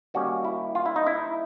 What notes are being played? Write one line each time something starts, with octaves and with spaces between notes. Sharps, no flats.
D#3 G3 A#3 C#4 F#4
E4
F4
E4
D#4
E4